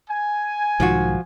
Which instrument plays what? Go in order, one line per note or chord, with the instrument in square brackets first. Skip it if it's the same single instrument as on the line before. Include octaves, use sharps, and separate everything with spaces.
[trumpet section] G#5
[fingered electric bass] B1 G#2 D#3 [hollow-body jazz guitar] F3 F4 F#4